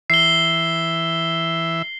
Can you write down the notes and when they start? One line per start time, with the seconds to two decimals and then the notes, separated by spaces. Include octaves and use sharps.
0.10 E3 E5 C7 G7